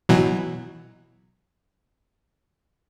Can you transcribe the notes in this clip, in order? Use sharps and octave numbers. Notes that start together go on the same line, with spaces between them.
B2 E3 F#3